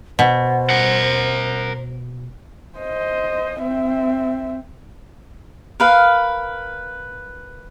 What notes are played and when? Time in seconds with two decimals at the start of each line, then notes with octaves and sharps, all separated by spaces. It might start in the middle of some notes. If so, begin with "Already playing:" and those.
0.19 B2 C5
0.70 A#4 F#5
2.79 C5 D#5
3.60 C4 E5
5.80 A#4 B4 F5